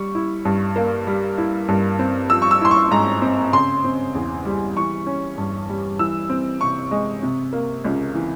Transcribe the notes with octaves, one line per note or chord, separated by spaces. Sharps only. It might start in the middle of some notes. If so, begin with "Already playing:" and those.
Already playing: G3 C#6
E4
G2
A#3
G3
E4
G2
C4
F3 E6
C#6
E6
E4 C6
C#6
G#2 A#5
C4
C#3 C6
C4
E2
G3
E3 C#6
C#4
G2
G3
E3 E6
C4
C3 C#6
G#3
C3
A#3
C#2
E3